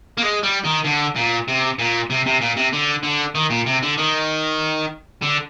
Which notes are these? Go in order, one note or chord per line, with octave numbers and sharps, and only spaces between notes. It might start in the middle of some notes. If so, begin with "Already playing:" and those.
A#3
G#3
G3
D#3
D3
A#2
C3
A#2
C3
C3
A#2
C3
D3
D3
D#3
A#2
C3
D3
D#3
D3